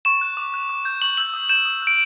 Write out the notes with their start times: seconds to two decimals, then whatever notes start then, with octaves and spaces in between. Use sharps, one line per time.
0.05 C#6 E7
0.21 F#6
0.37 D6
0.54 F#6
0.69 D6
0.85 G6
1.02 C#6 F#7
1.17 E6 G6 F#7
1.33 D#6
1.49 G6 E7
1.65 D#6
1.82 F#6
1.87 D7